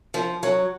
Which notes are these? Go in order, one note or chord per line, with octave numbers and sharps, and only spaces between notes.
F3
F#3